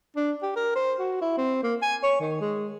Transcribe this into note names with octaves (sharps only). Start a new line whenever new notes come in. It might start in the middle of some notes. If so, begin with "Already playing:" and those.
D4
G4
A#4
C5
F#4
E4
C4
A#3
G#5
C#5
D#3
G#3